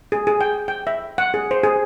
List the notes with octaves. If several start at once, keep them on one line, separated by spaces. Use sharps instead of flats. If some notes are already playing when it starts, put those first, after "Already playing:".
G#4
G#4
G5
G5
E5
F#5
G#4
C5
G#4